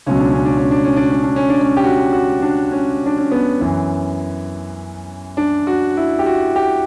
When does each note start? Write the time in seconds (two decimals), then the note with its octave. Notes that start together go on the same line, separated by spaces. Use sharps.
0.06 C#2 B2 F#3 C#4
0.20 D4
0.32 C#4
0.45 D4
0.57 C#4
0.71 D4
0.85 C#4
0.96 D4
1.10 C#4
1.23 D4
1.36 C#4
1.49 D4
1.62 C#4
1.77 G4
1.84 F#4
2.13 F#4
2.42 D4
2.72 C#4
3.06 D4
3.18 C#4
3.31 B3
3.61 F#2 E3
5.37 D4
5.67 F#4
5.97 E4
6.19 G4
6.26 F#4
6.56 G4